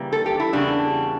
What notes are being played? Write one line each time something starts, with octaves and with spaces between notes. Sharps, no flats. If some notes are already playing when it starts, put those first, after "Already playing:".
Already playing: C#3 E3 G3 A#3
A4
G4
E4
E2 C#3 G3 A#3 D4